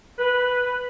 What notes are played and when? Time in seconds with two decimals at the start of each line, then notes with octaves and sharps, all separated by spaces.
0.19 B4